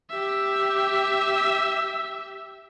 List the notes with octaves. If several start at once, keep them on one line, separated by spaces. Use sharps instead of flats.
G4 E5